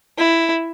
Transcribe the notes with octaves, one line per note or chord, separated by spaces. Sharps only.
E4